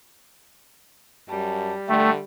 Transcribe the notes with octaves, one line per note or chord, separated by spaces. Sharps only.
F#2 G3 A5
D3 A3 G5